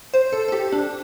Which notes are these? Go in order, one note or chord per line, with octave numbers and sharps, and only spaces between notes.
C5
A4
A4
G4
D4